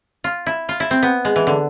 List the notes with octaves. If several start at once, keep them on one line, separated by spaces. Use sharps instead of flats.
F4
E4
F4
E4
C4
B3
G#3
E3
D3